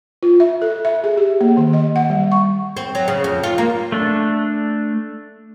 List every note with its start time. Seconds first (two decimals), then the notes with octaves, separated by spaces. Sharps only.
0.23 F4
0.40 E5
0.62 A4
0.85 E5
1.04 G#4
1.17 G4
1.41 A#3
1.57 D#3
1.73 D#5
1.96 F#5
2.10 G3
2.32 C#6
2.77 C4
2.95 F#3
3.08 C#3
3.24 F2
3.43 F4
3.58 A#3
3.92 A3 D4